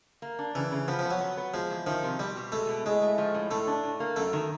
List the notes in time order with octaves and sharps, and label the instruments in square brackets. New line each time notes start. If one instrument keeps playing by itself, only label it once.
[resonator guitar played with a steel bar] A#3
D4
[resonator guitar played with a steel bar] C#3 [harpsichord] E3
[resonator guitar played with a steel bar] C#3
[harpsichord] F3 [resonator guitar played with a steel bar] B3
[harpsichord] F3
[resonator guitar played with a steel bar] B3
[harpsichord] F#3
[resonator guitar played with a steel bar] B3
B3
[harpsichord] F3 [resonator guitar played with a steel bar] G#3
[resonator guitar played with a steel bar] E2
[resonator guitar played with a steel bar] D#3 [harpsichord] F3
[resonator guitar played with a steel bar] C3
[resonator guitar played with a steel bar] B2 [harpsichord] G3
[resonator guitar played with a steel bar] B2
[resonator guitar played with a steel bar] G#3 [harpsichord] A3
[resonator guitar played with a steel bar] B2
[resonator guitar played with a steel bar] A2 [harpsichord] G#3
[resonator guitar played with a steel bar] A3
F3
A2
[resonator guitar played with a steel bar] A2 [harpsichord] A3
[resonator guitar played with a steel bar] D4
A2
A#3
[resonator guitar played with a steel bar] F#2 [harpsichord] A3
[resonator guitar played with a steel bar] D#3